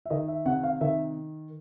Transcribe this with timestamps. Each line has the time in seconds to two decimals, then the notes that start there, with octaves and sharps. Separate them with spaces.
0.06 E5
0.10 D#3 D#5
0.28 E5
0.46 C3 F#5
0.63 F5
0.81 D#3 E5